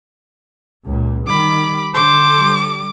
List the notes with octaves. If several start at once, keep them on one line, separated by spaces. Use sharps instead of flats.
C#2 A#2
D#3 G3 B5 D6
D3 A4 C5 D6
G3